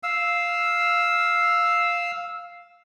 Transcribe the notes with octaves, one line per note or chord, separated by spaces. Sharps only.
F5 E6